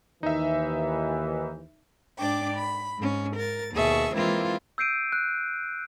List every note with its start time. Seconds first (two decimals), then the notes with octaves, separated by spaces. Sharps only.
0.23 D#2 E3 D#4 E5
2.19 G#2 D4 D5 G5 D6
2.56 B5
2.97 G#2 C#4
3.36 A#4 A6
3.73 D#2 B2 G#4 E5 A5 C#6
4.15 E3 G#3 A#3 C4 E4 F4
4.78 E6 G6 C7 D7 D#7
5.12 F#6